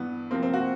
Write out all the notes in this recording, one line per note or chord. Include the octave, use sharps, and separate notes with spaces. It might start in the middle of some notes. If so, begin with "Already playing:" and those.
Already playing: G2 E3 B3
C3 F3 A#3 C4
C4
F#4